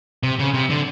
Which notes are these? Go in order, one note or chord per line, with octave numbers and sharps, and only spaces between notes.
C3
C#3
C3
D3